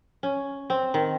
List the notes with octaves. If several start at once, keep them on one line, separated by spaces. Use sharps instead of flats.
C#4
C4
D#3